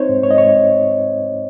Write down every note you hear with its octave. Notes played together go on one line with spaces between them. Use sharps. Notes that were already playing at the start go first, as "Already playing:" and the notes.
Already playing: C4 D#4 C5 C#5
G#2
G#2 C#5
D#5
G#2 C#5